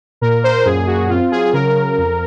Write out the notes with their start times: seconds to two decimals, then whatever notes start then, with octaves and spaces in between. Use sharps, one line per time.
0.21 A#2 A#4
0.44 A#2 C5
0.65 F#2 G#4
0.87 F#2 F#4
1.09 C4 F4
1.32 F#3 G#4
1.53 C#3 A#4
1.75 C#3
1.98 F2